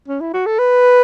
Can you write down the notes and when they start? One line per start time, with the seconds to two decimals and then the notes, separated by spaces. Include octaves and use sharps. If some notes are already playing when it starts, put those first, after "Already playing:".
0.08 C#4
0.21 E4
0.34 F#4
0.46 A4
0.59 B4